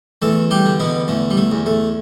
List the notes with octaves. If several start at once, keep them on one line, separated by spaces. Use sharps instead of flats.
E2 A3 A4
G3 G4
D3
B2 B3
E2 A3
G3
A3
E2
A3